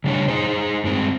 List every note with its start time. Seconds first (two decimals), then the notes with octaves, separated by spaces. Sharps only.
0.04 C#3 G3 D4 C#5
0.28 D#4 G#4 C5
0.84 G2 G#3 C4